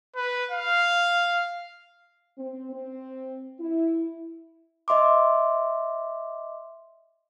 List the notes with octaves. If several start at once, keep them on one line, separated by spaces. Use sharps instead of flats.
B4
F5
C4
C4
E4
D#5 E5 C6 D6